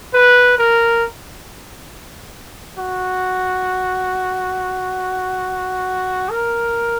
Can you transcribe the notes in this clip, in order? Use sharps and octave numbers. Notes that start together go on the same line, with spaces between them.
B4
A#4
F#4
A#4